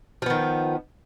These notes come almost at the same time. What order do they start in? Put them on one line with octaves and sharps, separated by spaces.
F3 B3 D#3